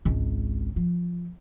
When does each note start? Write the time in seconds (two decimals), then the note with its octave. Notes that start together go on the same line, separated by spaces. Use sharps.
0.05 G#1 C#2
0.76 F3